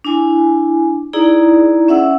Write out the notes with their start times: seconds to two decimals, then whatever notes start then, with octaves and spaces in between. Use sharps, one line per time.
0.04 D4 E4 G#5
1.13 D#4 E4 G#4 D5 A#5
1.88 C#4 E5 F#5 E6